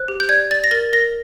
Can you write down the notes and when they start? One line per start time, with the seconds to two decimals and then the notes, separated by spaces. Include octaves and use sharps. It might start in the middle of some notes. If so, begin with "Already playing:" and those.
Already playing: C5 F#6
0.08 G4
0.20 G6
0.29 D5 G#6
0.51 D5 A6
0.64 A#6
0.71 A#4 A6
0.93 A#4 A#6